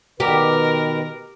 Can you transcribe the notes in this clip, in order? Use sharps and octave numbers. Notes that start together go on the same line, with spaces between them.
B2 D#3 G4 A#4 B4